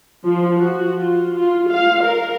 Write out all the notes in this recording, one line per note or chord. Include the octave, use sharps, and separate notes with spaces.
F3
F#4
F4
F4
F5
A#4